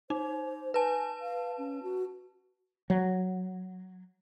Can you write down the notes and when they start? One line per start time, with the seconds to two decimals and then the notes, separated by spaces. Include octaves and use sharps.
0.10 D#4 C5
0.74 B4 G#5 A5
1.21 F5
1.58 C#4
1.83 F#4
2.90 F#3